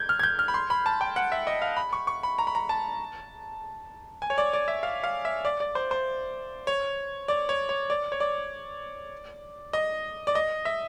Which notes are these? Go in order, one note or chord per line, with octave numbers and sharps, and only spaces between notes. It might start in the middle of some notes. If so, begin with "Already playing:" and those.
Already playing: G6 G#6
F6
G#6
G6
F6
B5
C6
B5
A5
G5
F#5
E5
D#5
F5
B5
C#6
C#6
B5
A#5
B5
A#5
A5
G#5
C#5
D5
D5
E5
F5
F5
E5
D5
D5
C5
C5
C#5
D5
C#5
C#5
D5
C#5
D5
D#5
D5
D#5
E5